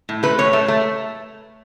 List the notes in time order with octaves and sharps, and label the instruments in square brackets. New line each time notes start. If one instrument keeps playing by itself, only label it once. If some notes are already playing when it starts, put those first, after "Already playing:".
[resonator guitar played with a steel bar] A2
A3 B4
A2 C#5
A3
A3